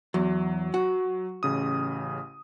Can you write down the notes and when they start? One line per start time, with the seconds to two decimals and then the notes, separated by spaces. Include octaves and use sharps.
0.14 E2 F#3
0.74 F#4
1.43 A1 C#3 D#6